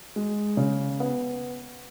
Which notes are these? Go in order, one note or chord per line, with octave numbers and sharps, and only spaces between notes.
G#3
C#3
B3